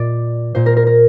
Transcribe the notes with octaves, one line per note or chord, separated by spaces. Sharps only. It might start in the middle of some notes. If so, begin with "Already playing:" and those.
Already playing: A#2 D5
A#2 C5
A#4
A#4
A#4